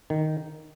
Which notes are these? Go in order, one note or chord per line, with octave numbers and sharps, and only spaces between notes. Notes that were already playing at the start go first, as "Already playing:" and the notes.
D#3